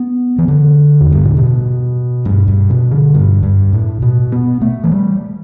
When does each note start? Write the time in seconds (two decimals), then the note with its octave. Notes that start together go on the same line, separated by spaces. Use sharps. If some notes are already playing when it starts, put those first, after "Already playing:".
Already playing: B3
0.38 E3
0.48 D3
1.01 E2
1.12 G2
1.25 A2
1.37 B2
2.25 G2
2.48 G2
2.70 B2
2.91 D3
3.14 G2
3.43 G2
3.73 A2
4.02 B2
4.32 B3
4.62 A3
4.84 E3
4.91 G3